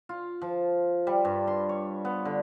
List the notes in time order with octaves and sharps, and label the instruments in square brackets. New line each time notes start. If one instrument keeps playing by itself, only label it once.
[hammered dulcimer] F4
F3
G3
G2
C6
C#5
B3
D3